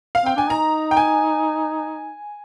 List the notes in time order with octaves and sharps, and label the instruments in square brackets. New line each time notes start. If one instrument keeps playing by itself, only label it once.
[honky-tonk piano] F5
[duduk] C4 [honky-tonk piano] G5
[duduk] D4 [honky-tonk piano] G#5
[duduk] D#4 [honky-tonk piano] A#5
[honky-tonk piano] G5
G#5